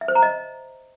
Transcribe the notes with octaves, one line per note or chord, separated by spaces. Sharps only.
E5
C5
A#5
D#5